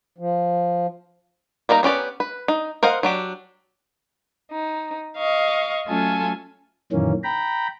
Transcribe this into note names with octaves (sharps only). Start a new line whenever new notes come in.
F3
G3 A#3 D#4 A#5
B3 C#4 G4 D5
B4
D#4
A#4 C5 D#5 F5 F#5
F#3 D4 G4
D#4
D#5 F5 C#6
F#3 A3 C#4 F4 A4 G#5
F#2 A#2 D#3 E3 A#3 C#4
G5 A#5 B5